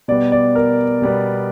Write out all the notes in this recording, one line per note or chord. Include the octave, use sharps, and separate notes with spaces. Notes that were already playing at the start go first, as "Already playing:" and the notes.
B2 G3 B3 D5
D5
A#4
B2 G3 B3